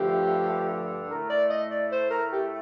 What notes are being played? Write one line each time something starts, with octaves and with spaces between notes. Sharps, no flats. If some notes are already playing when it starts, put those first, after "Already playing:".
Already playing: G2 D3 F3 A3 G4
A2 A3 A#4
D5
D#5
D5
C5
A#4
G4